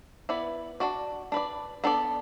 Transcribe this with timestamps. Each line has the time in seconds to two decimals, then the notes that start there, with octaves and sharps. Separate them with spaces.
0.29 B3 E4 B4 D5
0.80 D4 F#4 D5
1.32 D4 B4 D5
1.84 B3 D4 A4 D5